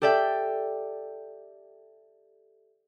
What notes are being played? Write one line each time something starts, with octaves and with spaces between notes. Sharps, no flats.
G4 A4 D5 E5 G5